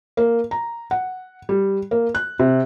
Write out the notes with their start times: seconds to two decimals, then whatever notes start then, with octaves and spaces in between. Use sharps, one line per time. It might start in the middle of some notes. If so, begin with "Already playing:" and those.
0.17 A#3
0.51 A#5
0.91 F#5
1.49 G3
1.91 A#3
2.15 F#6
2.39 C3